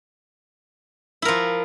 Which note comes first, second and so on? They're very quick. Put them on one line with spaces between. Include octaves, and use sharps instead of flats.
E4 A#4 F3